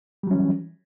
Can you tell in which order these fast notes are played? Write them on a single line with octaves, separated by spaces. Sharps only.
G3 F#3 C#4 E3